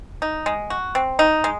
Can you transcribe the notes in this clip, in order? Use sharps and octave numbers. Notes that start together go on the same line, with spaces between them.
D#4
G#3
F#4
C4
D#4
G#3